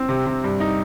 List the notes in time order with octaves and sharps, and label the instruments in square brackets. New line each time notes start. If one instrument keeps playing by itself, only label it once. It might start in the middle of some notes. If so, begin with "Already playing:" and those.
Already playing: [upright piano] C4
C3
C3
G2
D#4